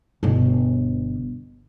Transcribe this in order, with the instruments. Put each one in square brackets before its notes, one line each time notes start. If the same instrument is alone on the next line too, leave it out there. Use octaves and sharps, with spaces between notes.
[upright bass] G1 B2